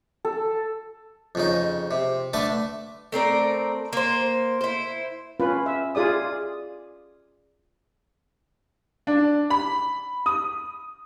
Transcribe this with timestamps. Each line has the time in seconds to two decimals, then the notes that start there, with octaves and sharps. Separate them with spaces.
0.25 A4
1.35 F2 C#3 D#4
1.91 C3
2.33 D3 A3 B4 A5
3.12 A3 C4 A#4 D5
3.93 A#3 C5
4.61 E4 C5
5.40 C#4 F4 B4
5.66 E5
5.95 F4 G#4 D5 D#6
9.07 D4
9.50 B5
10.26 D#6